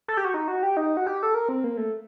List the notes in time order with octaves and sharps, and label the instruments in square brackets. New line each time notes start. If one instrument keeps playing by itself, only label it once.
[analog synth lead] A4
G4
F#4
D#4
F#4
G4
D#4
F#4
G4
A4
A#4
C4
A#3
A3